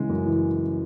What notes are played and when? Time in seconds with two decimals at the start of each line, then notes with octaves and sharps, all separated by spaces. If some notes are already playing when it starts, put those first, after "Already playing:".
Already playing: C#3 E3 G#3
0.09 F#2
0.26 E3